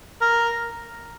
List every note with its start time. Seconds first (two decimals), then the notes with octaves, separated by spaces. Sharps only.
0.22 A#4